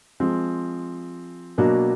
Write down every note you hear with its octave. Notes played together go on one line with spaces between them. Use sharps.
F3 G#3 C4
B2 F#3 A#3 D4 F#4